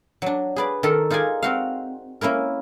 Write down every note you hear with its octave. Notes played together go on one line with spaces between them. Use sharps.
F#3 D4
G#4 B4 D5
D#3 A4 A#4
D#4 F4 G#4 D5 G#5
C4 F#4 F5
A#3 C#4 E4 A#4